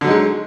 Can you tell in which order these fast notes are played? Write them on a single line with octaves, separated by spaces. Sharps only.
D3 F#3 D#4 G#3